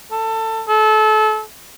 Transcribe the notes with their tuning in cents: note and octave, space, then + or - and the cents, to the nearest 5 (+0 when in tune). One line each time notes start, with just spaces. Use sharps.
A4 +20
A4 -30